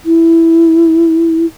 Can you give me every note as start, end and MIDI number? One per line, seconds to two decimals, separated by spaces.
0.06 1.46 64